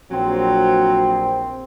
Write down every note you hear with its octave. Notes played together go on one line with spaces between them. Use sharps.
A#1 F#3 C4